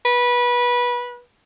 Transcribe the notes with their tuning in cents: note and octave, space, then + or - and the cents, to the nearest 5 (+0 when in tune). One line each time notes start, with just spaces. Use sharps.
B4 -20